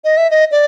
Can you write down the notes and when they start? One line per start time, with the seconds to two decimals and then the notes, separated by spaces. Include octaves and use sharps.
0.04 D#5
0.17 E5
0.31 D#5
0.51 D5